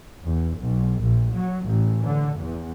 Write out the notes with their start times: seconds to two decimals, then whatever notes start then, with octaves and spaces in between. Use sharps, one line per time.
0.23 E2
0.59 B1
1.01 A#1
1.31 F#3
1.66 A1
2.05 D3
2.38 E2